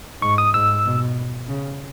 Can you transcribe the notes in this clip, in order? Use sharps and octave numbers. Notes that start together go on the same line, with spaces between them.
G#2 C#6
D#6
G#2 E6
B2
C#3